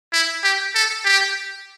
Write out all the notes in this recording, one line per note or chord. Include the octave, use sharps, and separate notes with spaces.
E4
G4
A4
G4